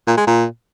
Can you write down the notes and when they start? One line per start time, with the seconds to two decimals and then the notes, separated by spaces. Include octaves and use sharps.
0.08 A#2
0.17 G#3
0.27 A#2